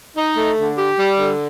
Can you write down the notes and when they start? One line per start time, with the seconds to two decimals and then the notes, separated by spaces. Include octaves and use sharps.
0.16 D#4
0.37 A3
0.58 D3
0.78 G4
0.98 G3
1.18 D3